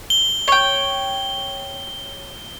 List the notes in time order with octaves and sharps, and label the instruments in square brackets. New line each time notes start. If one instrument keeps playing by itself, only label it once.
[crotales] G7
[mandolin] C#5 G5